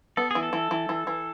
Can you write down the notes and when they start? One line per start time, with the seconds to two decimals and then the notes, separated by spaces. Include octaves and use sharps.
0.17 B3 A4
0.31 E3 G#4
0.43 A4
0.53 E3
0.71 E3
0.89 E3
1.07 E3